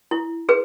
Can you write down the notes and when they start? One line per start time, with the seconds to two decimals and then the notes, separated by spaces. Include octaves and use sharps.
0.11 E4
0.49 G#4 B4